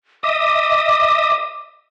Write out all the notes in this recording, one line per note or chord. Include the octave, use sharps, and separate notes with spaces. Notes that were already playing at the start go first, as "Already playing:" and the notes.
D#5 E5 D6 D#6